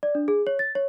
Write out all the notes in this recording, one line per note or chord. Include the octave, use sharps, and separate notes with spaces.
D5
D4
G#4
C#5
A6
C#5